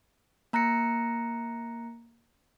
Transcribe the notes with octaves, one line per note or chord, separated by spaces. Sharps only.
A#3 A#5 F#6 A#6 C#7